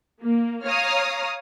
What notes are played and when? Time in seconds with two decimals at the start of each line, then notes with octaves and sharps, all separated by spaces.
0.22 A#3
0.65 C#5 F5 A#5 D#6 F6